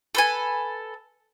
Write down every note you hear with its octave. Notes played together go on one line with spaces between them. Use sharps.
A4 B4 G#5